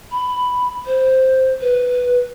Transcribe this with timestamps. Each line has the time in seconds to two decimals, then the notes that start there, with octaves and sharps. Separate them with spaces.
0.12 B5
0.86 C5
1.61 B4